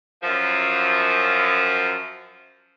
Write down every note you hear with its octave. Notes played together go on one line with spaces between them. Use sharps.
F#2 F3